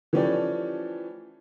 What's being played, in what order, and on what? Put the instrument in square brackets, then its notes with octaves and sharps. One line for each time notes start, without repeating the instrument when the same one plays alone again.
[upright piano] E3 F3 A3 C#4 G4 D5